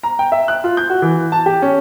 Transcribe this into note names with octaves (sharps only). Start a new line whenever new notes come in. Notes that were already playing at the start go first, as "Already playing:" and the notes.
A#5
G5
E5
F#6
F4
G6
F#4
E3
A5
G4
C#4